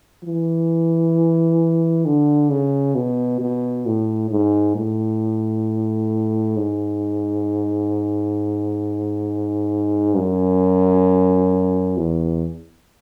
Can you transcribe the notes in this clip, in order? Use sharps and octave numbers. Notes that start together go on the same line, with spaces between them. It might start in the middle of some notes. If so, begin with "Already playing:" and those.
E3
D3
C#3
B2
B2
A2
G#2
A2
G#2
F#2
E2